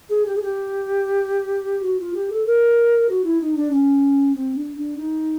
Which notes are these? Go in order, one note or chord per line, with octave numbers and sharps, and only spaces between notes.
G#4
G4
G#4
G4
F#4
F4
G4
A4
A#4
F#4
E4
D#4
D4
C#4
C4
D4
D4
D#4